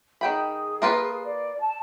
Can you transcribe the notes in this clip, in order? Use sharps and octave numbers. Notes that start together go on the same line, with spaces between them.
D#3 G#4 G5 B5
A#3 F4 B4
D5
A5